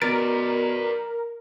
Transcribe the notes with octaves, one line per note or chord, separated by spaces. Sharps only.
B2 A#4 B4 D5 A6 D7